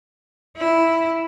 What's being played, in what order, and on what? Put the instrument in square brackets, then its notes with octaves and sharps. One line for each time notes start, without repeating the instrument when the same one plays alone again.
[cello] E4